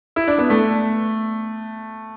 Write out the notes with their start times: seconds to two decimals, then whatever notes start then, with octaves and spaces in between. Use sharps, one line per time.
0.16 E4
0.28 D4
0.38 B3
0.50 A3